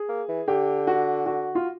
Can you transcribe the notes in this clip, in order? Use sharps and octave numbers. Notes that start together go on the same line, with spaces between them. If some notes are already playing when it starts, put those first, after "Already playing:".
Already playing: G#4
A#3
E3
D3 G4
F#4
F#4
F4